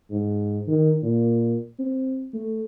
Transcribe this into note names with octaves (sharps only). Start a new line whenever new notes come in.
G#2
D#3
A#2
C4
A3